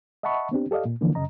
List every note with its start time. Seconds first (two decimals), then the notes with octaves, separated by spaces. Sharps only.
0.23 D#5 E5 F#5 A5 B5 C#6
0.51 B3 C4 D4 G4
0.71 G4 A4 D5 D#5 F5
0.85 A#2
1.01 D3 E3 F3 A#3
1.15 F#2 C#3 D#5 A#5